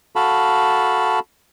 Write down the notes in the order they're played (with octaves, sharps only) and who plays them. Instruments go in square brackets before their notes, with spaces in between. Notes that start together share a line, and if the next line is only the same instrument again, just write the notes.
[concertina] F#4 A4 F5 A5 B5